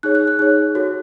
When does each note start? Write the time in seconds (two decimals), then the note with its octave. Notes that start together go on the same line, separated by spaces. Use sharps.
0.03 D#4 G#4 C#5 F#6
0.15 F#6
0.27 F#6
0.39 D#4 G#4 C#5 F#6
0.75 F#4 A4 C#5